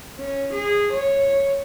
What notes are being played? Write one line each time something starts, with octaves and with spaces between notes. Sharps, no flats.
C#4
G#4
C#5